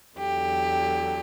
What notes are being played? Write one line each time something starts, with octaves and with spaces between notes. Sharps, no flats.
E2 D3 F#3 G4